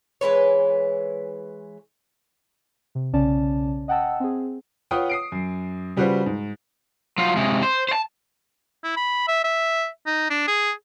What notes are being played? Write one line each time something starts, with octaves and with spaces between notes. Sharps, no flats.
E3 G#3 B4 C#5
C3
B1 C#3 C#4 D5 A5
D#5 F#5 G5 A5 E6
C4 G#4
F4 B4 C#5 F#5 G5 D#6
D#6 C7 D7
F#2
C#3 G3 F4 F#4 B4 C5
G#2
F#3 F4
C3 G#3
C5
C5 A5
E4
B5
E5
E5
D#4
D4
G#4